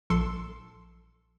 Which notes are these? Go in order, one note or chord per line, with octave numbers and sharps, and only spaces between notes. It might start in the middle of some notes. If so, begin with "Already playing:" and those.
A#1 A4 C6